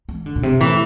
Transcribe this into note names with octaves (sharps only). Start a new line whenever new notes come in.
E3
D3
A#2
C3
A2 E3